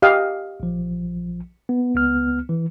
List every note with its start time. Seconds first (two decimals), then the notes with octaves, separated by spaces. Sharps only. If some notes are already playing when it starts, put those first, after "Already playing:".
0.02 G4 D#5 F5
0.60 A#1 F3
1.69 B3
1.95 C#2 B3 F6
2.49 E3